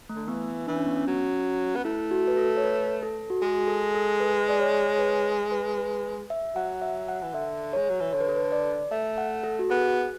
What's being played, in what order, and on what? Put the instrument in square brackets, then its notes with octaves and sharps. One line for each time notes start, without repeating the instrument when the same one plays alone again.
[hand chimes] A3
[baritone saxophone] D3
[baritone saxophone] E3 [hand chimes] B3
[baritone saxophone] E3 [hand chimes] D4
[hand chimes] C#4
B3
C#4
[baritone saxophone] F#3
B3
[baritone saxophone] A3 [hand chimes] E4
[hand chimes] F#4
B4
A4
C#5
B4
A4
F#4
[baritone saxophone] G#3 [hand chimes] G#4
[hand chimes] A4
A4
B4
D5
C#5
C#5
B4
B4
B4
E5
[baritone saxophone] F#3 [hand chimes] F#5
[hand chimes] E5
F#5
[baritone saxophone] E3
[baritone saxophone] D3 [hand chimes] E5
[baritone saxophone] G#3 [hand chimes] C#5
[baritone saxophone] F#3
E3
[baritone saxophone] D3 [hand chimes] C#5
[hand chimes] B4
A4
B4
D5
[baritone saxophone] A3 [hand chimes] E5
[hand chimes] F#5
A4
F#4
[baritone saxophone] B3 [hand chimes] G#4